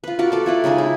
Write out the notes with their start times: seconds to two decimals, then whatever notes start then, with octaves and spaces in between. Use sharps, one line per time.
0.04 F4 B4
0.19 F4 F#4 A#4 D5
0.32 A4 D5
0.46 E4 F4 B4
0.64 C#3 G#3 D#4 G#4
0.78 E4